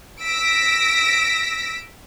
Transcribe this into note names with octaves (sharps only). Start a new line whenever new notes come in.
E6 A#6 B6 D7